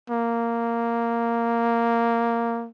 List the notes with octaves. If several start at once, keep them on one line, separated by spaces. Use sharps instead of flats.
A#3